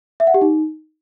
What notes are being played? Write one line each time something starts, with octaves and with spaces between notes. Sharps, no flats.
E5
F#5
G4
D#4